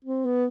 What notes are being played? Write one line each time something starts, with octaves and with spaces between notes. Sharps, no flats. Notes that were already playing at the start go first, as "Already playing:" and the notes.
C4
B3